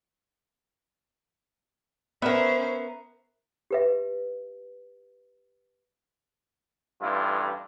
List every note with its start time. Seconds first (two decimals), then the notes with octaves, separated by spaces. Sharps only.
2.22 B3 C#4 A#4 C5 E5
3.71 G4 B4 E5
7.01 A1 G2 E4 F4